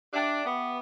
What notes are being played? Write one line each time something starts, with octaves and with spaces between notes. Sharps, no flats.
D4 G4 E5 G5 D6
B3